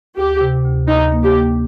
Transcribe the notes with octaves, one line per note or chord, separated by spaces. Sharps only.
D2 G4
C3
D2
D2 D#4
A#3
G4
A#3